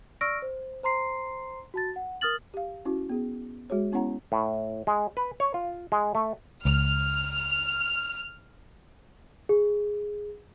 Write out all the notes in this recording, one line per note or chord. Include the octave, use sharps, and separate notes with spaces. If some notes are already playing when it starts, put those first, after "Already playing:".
D5 C#6 E6 F6 A#6 D7
C5
C5 A#5 C6 C7
F#4 A5 A6
F#5
A#4 D#6 F6 A6 F#7
G4 F5
C#4 E4 F#4
B3 G#4
G#3 F#4 G#4 C#5
B3 C#4 E4 C#5 F#5 A#5
A2
G#3
B4
C#5
F4
G#3
A3
C#2 F6
G#4